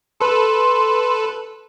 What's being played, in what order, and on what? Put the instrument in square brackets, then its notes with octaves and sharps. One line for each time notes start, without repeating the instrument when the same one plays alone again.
[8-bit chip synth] A4 B4 [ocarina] C6